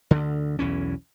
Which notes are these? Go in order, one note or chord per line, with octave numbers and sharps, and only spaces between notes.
D2 D3
B1 E2 E3 C#4